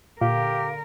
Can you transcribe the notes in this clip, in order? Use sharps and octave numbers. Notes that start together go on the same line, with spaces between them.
A#2 D3 G4 A#4 F5